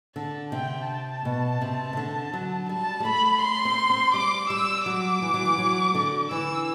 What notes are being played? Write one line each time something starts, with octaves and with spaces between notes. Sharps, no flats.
D3 A5
C3 G5
A5
B2
C3
C3
D3
F#3
G3 A5
G3
A3 B5
C6
C4
C4
G3 D6
G3 E6
F#3 D6
E3
F#3
E3
F#3
D3
E3 E6